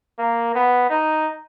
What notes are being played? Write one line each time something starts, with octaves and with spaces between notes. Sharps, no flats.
A#3
B3
D#4